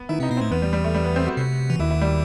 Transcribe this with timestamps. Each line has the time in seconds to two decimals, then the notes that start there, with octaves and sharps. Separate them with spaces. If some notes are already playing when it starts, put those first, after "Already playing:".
Already playing: B3
0.09 D#3 D#4 E4
0.20 C3 C4 D#4
0.31 B2 B3
0.37 A2 A3 C4
0.51 E2 E3 B3
0.62 G3
0.73 G3
0.84 A3
0.94 G3
1.05 B3
1.16 C4
1.27 F#4
1.37 C3
1.70 E3
1.80 D#2 D#3 E4
1.91 E4
2.01 G3